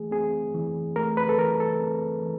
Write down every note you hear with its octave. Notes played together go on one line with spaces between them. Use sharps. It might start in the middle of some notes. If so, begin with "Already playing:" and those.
Already playing: E3 A3 G#4
C4 G#4
E3
A3 A#4
B4
A4
E3 A#4
A4
C4
E3